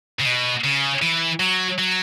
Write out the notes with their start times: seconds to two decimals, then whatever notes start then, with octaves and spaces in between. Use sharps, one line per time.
0.20 C#3
0.25 B2
0.64 C#3
1.02 E3
1.40 F#3
1.78 F#3